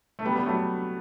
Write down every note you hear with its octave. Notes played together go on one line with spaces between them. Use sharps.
A3
G3 B3
G3 B3
F#3 A3